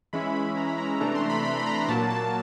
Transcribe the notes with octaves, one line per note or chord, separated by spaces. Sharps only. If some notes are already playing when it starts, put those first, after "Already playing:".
E3 G#3 C#4 E4 B5
B5
A#5
B5
A#5
C3 E3 A3 D4 A#5
C6
B5
B5
B5
A#5
A#2 F#3 A#3 A5
A5